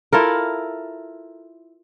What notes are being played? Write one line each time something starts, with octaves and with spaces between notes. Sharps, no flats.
E4 F4 A4 A#4